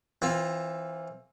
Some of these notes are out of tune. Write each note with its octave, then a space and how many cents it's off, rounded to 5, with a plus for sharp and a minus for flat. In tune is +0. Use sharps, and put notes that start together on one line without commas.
E3 +0 C4 +25 F4 +0